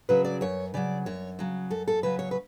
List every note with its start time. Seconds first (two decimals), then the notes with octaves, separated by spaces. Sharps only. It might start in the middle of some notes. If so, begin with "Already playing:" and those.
0.09 C#3 F#3 B4
0.25 D5
0.41 F#2 C#5
0.74 C#3 F#3 D5
1.06 F#2 C#5
1.39 C#3 F#3
1.70 F#2 A4
1.88 A4
2.03 C#3 F#3 B4
2.19 C#5
2.31 B4